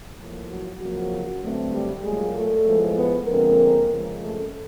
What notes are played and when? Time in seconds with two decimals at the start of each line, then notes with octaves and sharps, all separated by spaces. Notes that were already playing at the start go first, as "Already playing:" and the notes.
0.18 A2 F3 A#3
0.48 F#3 F#4
0.80 F2 C#3 F3 F#3 A#3 F#4
1.41 G2 D3 F#3 A3 C4
1.73 G3 G4
2.03 A#2 F#3 G#3 A#3 G#4
2.35 A3 A4
2.65 A2 F3 G#3 B3
2.96 B3 B4
3.27 F2 D3 F3 G#3 A#3 C4 A#4
3.89 C#3 F3 G#3
4.20 A3 A4